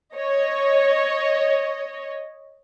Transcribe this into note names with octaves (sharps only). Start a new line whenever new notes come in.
C#5 D#5